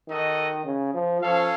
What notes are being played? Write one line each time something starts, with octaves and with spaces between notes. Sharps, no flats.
D#3 D#4 F#4 A4 D#5
C#3
F3
F3 C#4 A4 C#5 F5